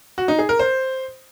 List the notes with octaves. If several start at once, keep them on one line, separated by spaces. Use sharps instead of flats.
F#4
D#4
G#4
A#4
C5